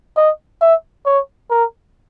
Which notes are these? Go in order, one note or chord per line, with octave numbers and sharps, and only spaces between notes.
D#5
E5
C#5
A#4